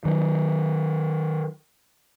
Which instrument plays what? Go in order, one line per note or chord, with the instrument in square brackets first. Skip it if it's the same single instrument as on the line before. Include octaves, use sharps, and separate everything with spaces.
[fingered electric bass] D#3 F#3